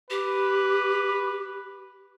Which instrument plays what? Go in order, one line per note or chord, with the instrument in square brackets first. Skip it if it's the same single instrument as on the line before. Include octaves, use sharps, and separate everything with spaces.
[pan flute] G4 [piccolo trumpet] B4